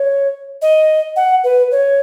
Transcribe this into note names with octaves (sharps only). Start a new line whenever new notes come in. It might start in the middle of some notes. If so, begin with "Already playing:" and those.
Already playing: C#5
D#5
F#5
B4
C#5